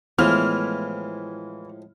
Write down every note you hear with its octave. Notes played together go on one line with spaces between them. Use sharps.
A2 E3 F3 G#3 A3 B3 F6